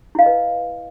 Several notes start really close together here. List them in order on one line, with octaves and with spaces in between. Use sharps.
E4 F5 D#5 B4